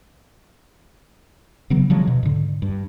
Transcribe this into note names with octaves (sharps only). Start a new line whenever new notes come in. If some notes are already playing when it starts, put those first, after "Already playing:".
C#3 E3 F#3 B3
D3 F3 F#3 G#3
B2
G#2 D3
G2